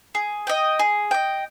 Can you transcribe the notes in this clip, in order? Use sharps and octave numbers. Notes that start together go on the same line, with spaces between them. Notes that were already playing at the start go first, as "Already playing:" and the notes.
G#4
D#5 G5
G#4
D#5 G5